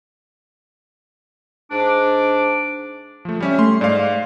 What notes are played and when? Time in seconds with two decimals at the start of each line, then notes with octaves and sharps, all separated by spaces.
1.71 G#2 D4 D6
3.25 F3 A3
3.40 G3 C#4 E5
3.59 A3 C6
3.81 G#2 D5 F5